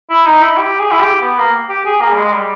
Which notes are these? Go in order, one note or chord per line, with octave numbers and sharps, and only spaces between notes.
E4
D#4
E4
G4
G#4
E4
G4
B3
A#3
G4
G#4
A#3
G3
G#3
G3